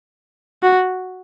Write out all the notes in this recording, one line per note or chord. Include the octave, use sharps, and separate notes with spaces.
F#4